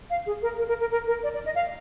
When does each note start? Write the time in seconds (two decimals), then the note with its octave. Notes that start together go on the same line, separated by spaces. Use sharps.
0.10 F5
0.26 G#4
0.42 A#4
0.58 A#4
0.68 A#4
0.81 A#4
0.91 A#4
1.07 A#4
1.23 D5
1.34 D5
1.46 D#5
1.55 F5